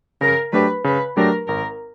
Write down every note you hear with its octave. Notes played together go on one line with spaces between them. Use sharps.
C#3 A#4
F#3 A3 D4 G4 B4
C#3 B4
F#3 A3 D4 G4 A#4
G#1 A#4